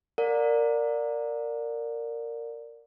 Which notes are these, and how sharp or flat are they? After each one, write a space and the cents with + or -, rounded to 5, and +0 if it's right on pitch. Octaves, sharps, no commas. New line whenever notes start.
A#4 -10 D5 +0 F#5 -45